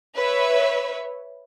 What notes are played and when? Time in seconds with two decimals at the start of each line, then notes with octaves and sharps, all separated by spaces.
0.15 B4 C#5 E5